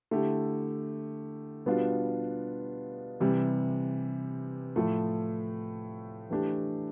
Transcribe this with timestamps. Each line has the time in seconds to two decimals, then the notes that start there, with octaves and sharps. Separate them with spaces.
0.11 D3 A3 E4 G4
1.66 B2 G3 B3 D4 F4
3.20 C3 E3 G3
4.76 A2 F3 A3
6.30 E3 A3 D4 G4